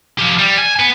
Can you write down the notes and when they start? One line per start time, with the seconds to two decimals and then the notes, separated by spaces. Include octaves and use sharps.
0.19 F3 G4
0.39 G3
0.58 G#5
0.80 B3